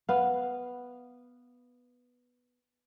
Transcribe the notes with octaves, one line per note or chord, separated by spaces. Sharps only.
B3 F5